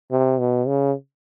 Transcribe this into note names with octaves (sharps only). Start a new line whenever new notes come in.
C3
B2
C#3